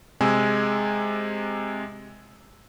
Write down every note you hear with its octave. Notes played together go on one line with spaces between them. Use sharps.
C3 G#3 G#5 E6